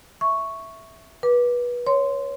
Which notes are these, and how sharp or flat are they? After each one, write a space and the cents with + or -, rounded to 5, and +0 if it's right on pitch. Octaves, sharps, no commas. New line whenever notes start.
E5 +0 C#6 +0
B4 -25 D6 +0
C#5 +5 C6 -10